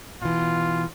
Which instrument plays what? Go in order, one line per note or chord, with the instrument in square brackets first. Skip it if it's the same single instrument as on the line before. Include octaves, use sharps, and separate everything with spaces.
[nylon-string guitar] B2 E3 [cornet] F4